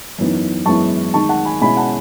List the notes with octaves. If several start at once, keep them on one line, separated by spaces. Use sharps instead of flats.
F#2 E3 B3 D#4
F#2 E3 G#3 B3 E4 A5 C#6
D#3 G#3 D#4 A5 C#6
F#5 A5
G#5 B5
B2 G#3 C#4 E4 G#5 B5
F#5 A5